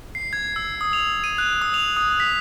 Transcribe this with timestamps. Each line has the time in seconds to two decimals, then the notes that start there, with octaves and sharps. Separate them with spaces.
0.15 C7
0.33 G#6
0.56 E6
0.81 D#6
0.93 F7
1.24 D#7
1.38 F#6
1.62 D#6
1.74 F7
1.97 D#6
2.20 B6